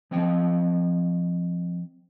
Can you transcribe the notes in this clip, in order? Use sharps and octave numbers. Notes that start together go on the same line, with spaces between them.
F3 C4 D#5 G5